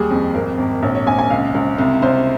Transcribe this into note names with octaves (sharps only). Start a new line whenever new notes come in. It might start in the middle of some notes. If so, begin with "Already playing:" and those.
Already playing: D#2 G3 G#4
F2
G#1 A#4
G#1
A#1 C#5
C#5
A#1 G#5
G#5
C#2 F5
C#2
C2
C2 C5